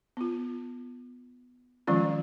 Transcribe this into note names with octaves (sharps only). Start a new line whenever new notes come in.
B3 F4
D#3 F3 F#3 G#3 C#4 F4